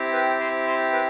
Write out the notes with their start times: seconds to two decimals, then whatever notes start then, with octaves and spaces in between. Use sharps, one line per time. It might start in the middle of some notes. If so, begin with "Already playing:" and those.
Already playing: C4 E4 G4
0.13 B4
0.40 C5
0.67 C5
0.93 B4